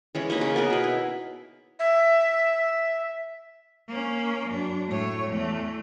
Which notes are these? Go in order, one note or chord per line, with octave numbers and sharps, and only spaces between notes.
E3 G#3 C#4
A#3 D#4 B4 D#5
C#3
B3 G#4 A#4 B4
B2 B4
E4
E5
A#3 C#4
F#2 D4
A2 C#5
E2 A3